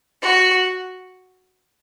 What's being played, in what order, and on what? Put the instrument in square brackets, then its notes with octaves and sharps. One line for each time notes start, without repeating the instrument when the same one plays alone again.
[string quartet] F#4